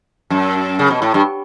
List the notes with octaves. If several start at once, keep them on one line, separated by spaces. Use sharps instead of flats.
F#2
C#3
B2
A2
G2